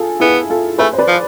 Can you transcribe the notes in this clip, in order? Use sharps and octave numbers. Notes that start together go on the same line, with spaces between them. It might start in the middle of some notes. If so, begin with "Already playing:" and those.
Already playing: F4 G#4 A4
B3 E4 G#4
F4 A4
A3 G#4 B4
C5
B4 D5
F3